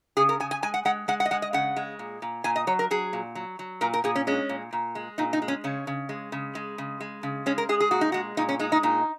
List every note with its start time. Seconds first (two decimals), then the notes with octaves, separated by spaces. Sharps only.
0.17 C#3 G#4
0.29 A#4
0.40 C#3 G#5
0.51 G#5
0.63 G#3 G#5
0.74 F#5
0.85 G#3 F#5
1.08 G#3 F#5
1.20 F#5
1.26 D#5
1.31 G#3 F#5
1.42 D#5
1.53 C#3 F#5
1.76 G#3
1.99 A#2
2.22 A#2
2.44 A#2 G#5
2.56 D#5
2.67 F#3 C#5
2.79 A#4
2.91 F#3 G#4
3.13 A#2
3.35 F#3
3.59 F#3
3.81 A#2 A#4
3.94 A#4
4.04 A#2 G#4
4.16 C#4
4.27 G#3 C#4
4.49 A#2
4.73 A#2
4.95 G#3
5.18 A#2 D#4
5.33 D#4
5.42 G#3
5.48 C#4
5.64 C#3 C#4
5.87 C#3
6.09 G#3
6.32 C#3
6.55 G#3
6.78 C#3
7.00 G#3
7.23 C#3
7.46 G#3 C#4
7.58 A#4
7.69 G#3 G#4
7.80 G#4
7.91 A#2 F#4
8.01 D#4
8.12 G#3 F#4
8.37 A#2 D#4
8.49 C#4
8.59 G#3 D#4
8.72 D#4
8.83 A#2 D#4